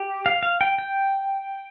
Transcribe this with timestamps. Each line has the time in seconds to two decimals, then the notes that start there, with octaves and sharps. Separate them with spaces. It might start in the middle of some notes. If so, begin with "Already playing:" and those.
Already playing: G4
0.26 F5
0.43 F5
0.61 G5
0.79 G5